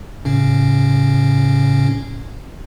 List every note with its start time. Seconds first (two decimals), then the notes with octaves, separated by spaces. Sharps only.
0.25 A2 C#3 C#4